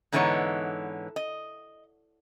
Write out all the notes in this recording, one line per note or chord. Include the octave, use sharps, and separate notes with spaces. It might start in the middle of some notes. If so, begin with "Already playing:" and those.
G#2 D3 E3 B3 D#4 C#5
D#5